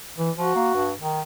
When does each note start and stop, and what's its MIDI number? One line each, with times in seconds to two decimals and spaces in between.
0.18 0.31 52
0.38 0.52 53
0.38 0.90 66
0.55 0.70 58
0.74 0.92 43
1.00 1.21 51